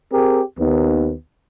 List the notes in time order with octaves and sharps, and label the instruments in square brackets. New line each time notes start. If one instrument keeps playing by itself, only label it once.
[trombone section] C4 G4 G#4 A#4
D#2 B3